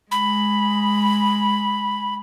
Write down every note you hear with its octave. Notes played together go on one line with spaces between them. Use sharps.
G#3 B5